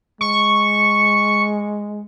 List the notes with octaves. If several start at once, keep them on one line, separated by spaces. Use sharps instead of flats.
G#3 C#6